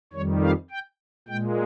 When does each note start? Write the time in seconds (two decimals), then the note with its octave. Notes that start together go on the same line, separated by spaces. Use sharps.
0.13 F2 D#3 G3 C#5
0.43 F5
0.70 G5
1.28 A#2 G#3 G5